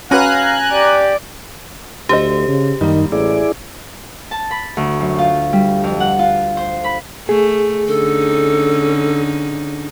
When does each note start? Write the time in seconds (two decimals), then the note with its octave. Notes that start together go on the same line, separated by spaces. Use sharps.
0.11 C#4 F#4 B4 F5 G#5 A#5 F#6
0.71 G4 D5
2.09 D2 G4 A4 C5 D#5
2.48 C#3
2.81 F#2 D#3 G3 A#3 D#4
3.12 A1 E4 G#4 D5
4.31 A5
4.51 B5
4.77 D2
5.00 F#2
5.19 F4
5.53 G3
5.83 F2
6.00 F#5
6.19 F4
6.57 C5
6.84 B5
7.29 A3 G#4
7.88 D3 C#4 D#4 A4